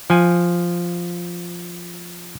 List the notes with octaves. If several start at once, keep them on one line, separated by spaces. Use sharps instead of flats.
F3 G#5